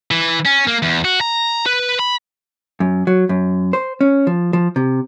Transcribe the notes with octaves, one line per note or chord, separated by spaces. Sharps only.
E3
C#4
A#3
E2
F#4
A#5
B4
B5
F#2
F#3
F#2
C5
C#4
F3
F3
C3